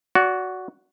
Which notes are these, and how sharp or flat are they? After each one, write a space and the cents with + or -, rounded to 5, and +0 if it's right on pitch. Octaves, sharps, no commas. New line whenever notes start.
F#4 +0 D5 -30